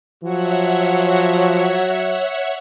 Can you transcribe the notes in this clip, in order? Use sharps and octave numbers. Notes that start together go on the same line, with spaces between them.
F3 F#3 F#4 C#5 E5 F#5